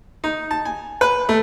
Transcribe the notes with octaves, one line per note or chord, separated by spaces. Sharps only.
D#4
A5
G#5
B4
A3